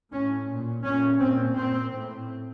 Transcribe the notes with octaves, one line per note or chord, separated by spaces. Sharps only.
A2 C#4
A#2
A#2 C#4
A#2 C4
A#2 C4
A2